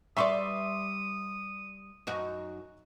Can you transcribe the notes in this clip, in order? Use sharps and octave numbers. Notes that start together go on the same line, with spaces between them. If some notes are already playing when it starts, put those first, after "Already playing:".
G3 B4 D5 E5 C6 C#6 D#6
F#2 D#4 F#4